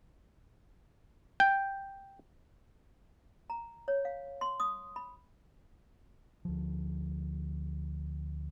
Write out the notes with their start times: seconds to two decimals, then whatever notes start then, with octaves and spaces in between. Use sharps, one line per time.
1.40 G5
3.50 A#5
3.88 C#5
4.05 F5
4.41 C6
4.60 D#6
4.96 B5
6.45 D2 F3